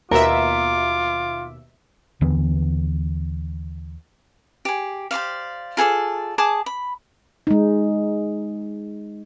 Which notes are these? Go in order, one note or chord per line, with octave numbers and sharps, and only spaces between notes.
D#2 B2 F4 A#4 E5 D6
D#2 D3 E3 B3
G4 G#4
G4 C5 D5 F5
F4 G#4 A4 D5
G#4 A5 D6 D#6
B5
G#3 D#4